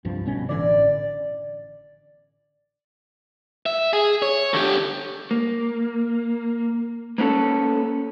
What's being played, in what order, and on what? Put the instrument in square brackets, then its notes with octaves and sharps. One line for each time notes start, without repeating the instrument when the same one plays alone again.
[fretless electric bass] C2 G2 F3
G1 B2 C#4
[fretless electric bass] A1 D3 E3 [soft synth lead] D5
[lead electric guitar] E5
G#4
C#5
D3 G4
[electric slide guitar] A#3
A#3 B3 C#4 A4